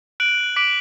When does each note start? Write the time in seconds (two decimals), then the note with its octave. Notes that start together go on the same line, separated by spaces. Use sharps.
0.20 F#6 D7 F#7
0.56 D6 B6 D7 F#7